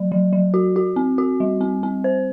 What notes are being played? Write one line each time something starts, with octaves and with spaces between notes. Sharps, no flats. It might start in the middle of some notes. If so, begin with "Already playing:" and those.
Already playing: F#3
F#3
F#3
F#4
F#4
C4
F#4
G3
C4
C4
C5